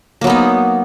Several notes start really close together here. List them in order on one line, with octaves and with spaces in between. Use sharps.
A#3 F#3 B3 D#4